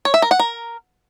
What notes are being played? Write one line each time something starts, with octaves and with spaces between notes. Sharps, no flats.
C#5
E5
A#4
F#5
A#4